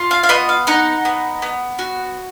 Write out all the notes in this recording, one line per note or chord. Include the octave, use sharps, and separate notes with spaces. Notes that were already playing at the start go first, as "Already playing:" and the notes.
Already playing: F4
F5
F5
B3 D#5
F5
D#4 F#5
B3
B3
F#4